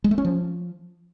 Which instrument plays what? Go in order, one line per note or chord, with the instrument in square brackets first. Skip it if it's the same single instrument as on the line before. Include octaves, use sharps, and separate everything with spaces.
[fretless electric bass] G#3
A3
C#4
F3